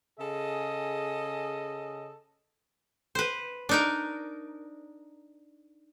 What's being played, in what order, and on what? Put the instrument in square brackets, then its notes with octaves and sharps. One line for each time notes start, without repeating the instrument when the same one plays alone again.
[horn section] C#3 G#4 A4 D#5
[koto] B4 C5
D4 D#4 A#4